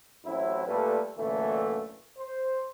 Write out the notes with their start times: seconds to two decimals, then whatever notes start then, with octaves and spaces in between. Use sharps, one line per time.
0.24 A1 F#3 C4 E4
0.67 A#2 G3 A3 A4 B4
1.17 F#2 A#2 D3 E3 A3
2.18 C5